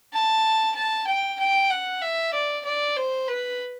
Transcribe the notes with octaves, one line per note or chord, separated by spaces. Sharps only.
A5
A5
G5
G5
F#5
E5
D5
D5
C5
B4